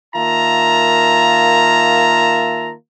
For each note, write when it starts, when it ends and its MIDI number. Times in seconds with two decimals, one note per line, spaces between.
0.14 2.73 51
0.14 2.73 58
0.14 2.73 65
0.14 2.73 76
0.14 2.73 81
0.14 2.73 82